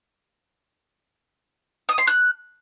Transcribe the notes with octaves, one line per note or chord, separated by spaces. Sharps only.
D#6
C6
F#6